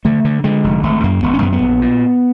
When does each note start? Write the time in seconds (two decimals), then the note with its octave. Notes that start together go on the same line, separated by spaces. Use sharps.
0.05 D3 A3
0.25 D3
0.44 D3 G#3
0.64 F1
0.83 G#1 A3
1.03 F#2 A#3
1.23 G#1 B3
1.34 C#4
1.42 F#2 B3
1.53 B3
1.62 A#1
1.82 A#2